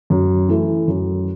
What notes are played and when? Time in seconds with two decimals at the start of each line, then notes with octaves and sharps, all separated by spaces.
0.10 F#2
0.49 E3 A3
0.88 F#2